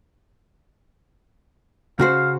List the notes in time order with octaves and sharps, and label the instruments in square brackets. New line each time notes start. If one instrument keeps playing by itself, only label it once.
[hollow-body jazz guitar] C#3 F#4 C5 [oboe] F5